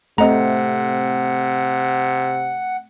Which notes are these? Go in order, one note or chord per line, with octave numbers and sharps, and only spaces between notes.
C3 A3 C4 D#5 F#5 A#5